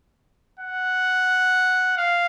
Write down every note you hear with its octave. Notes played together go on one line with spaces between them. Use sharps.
F#5
F5